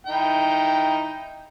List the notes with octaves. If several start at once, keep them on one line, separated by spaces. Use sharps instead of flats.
D#4 E4 G5